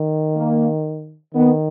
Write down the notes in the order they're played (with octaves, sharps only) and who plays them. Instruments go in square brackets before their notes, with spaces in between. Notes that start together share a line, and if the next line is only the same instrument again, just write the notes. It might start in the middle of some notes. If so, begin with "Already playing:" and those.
Already playing: [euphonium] D#3
[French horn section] A#3
[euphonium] D#3 [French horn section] B3